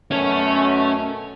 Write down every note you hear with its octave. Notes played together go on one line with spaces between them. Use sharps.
F#2 B2 A3 C#4 C#5